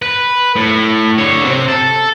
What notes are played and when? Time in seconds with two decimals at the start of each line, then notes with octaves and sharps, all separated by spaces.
0.02 B4
0.56 A2
1.18 D3 C#5
1.45 C3 C4
1.68 A4